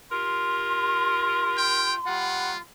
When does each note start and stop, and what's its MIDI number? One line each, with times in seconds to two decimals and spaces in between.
0.11 1.94 65
0.11 1.94 67
0.11 1.94 70
0.11 2.59 84
1.57 1.94 79
2.06 2.52 55
2.06 2.59 65
2.06 2.52 78